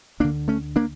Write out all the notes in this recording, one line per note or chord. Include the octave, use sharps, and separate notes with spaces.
D2 D3 A#3 D4
A3 C#4
A#3 D4